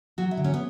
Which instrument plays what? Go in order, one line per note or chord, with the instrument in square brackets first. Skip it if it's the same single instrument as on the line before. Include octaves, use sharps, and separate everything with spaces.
[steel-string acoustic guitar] F#3 F#4
E4
D3
C#4
B3